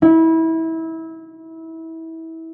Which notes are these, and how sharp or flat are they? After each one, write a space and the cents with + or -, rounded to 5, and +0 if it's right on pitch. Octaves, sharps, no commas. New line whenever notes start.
E4 -25